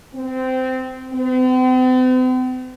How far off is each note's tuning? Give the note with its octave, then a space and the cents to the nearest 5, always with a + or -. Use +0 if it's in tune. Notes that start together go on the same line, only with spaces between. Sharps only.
C4 -15
C4 -45